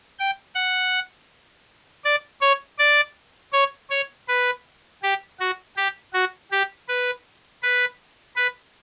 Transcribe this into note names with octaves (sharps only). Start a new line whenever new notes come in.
G5
F#5
D5
C#5
D5
C#5
C#5
B4
G4
F#4
G4
F#4
G4
B4
B4
B4